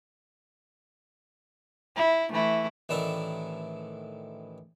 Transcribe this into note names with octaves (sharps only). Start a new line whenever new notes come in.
E4
E3 A3 E4
A1 D#3 D4 E4